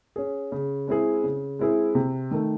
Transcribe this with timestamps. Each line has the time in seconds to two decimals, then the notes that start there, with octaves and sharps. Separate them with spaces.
0.16 C#4 G#4
0.52 C#3
0.88 G#3 C4 E4 G#4
1.24 C#3
1.59 G#3 C4 E4 G#4
1.95 C3
2.31 D#3 A3